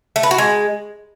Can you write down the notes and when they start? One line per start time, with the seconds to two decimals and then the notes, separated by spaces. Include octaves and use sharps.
0.16 A3
0.23 B4
0.31 F#4
0.38 G#3